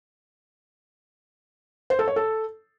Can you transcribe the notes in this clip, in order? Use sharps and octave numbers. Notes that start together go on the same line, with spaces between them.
C5
A4
C#5
A4